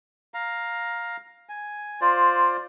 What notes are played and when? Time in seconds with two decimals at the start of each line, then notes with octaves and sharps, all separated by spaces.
0.34 F5 A#5
1.49 G#5
2.01 F4 C5 D5